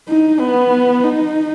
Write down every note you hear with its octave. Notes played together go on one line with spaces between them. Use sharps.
D#4
B3
D#4